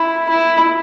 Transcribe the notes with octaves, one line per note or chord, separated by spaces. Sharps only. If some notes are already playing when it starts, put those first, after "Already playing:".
Already playing: E4
E4